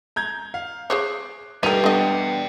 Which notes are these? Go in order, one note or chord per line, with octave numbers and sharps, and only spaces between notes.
A#5 G6 G#6
F5
G#4 C5 C#5 D6 F#6 C7
G2 A3 D#4 A#4 E5 G5 D#7 F7
G3 A3 B3 D4 D#5